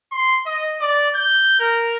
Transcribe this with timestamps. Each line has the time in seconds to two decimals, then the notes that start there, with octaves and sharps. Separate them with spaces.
0.12 C6
0.46 D#5
0.81 D5
1.15 G6
1.60 A#4